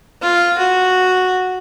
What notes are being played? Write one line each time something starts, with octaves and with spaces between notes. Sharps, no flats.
F4
F#4